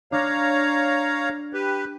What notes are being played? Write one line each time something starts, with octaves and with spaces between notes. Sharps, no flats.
D4 C#5 F5 A#5
G4 B4